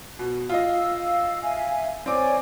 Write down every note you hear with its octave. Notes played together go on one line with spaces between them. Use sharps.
B2
F4 D#5 F5 E6
E5 F5 G#5
C4 C#5 D5 G#5 D6